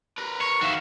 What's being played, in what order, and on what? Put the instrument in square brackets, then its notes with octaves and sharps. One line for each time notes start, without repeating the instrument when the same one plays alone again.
[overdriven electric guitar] A#4 B4
[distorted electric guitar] C#5 [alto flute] C#6
[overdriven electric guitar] D#3 F5 [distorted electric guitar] F#4 E5